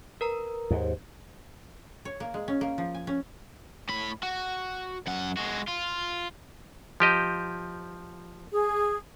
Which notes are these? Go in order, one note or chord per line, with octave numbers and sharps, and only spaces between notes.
A#4 B4 A#5
D#2 G#2
C#5
A#3
G#3
C#4
A#3
F3
G#5
C#4
A2 B5
F#4
F#2 F#5
G#3 F#4
F4
F3 G4 D#5
G#4